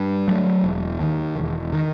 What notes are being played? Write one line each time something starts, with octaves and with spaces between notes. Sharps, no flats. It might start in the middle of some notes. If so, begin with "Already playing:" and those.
Already playing: G2
F#3 A3
E1
D#2 D#3
E1
D#3